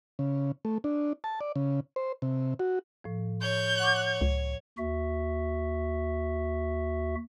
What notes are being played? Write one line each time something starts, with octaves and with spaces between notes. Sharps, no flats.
C#3
A3
D4
A5
D5
C#3
C5
C3
F#4
A2 F3
C#5 G6
F#5 C#6 D6
C#2
D#2 F#4 E5